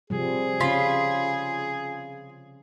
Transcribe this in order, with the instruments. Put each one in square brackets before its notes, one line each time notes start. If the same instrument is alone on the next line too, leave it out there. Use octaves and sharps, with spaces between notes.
[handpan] C3 F3 G3 [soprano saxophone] G#4
[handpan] C#3 C#4 [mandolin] F4 B5